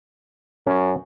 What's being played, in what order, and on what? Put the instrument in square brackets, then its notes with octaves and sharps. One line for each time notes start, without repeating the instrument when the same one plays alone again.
[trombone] F#2 [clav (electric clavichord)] C#4